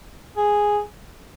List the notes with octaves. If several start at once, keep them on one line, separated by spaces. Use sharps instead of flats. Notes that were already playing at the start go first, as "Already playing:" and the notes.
G#4